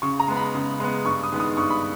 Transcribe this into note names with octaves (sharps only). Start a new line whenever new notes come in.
C#3 C#6
A#5
G#3 B3
B5
C#3
G#3 B3
G2 C#6
D#6
D#3 G#3 B3
D#6
G2 C#6
B5